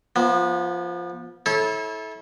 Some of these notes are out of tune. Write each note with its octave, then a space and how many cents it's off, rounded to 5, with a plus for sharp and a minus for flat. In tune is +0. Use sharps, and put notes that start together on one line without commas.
F3 +0 B3 -30
E4 -30 A4 -20 C#5 -35